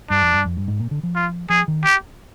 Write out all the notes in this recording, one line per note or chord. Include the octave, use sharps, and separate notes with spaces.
G2 D4
F2
G2
F2
G2
G#2
A#2
D3
F3
F4
F3 G#4
D#3
G4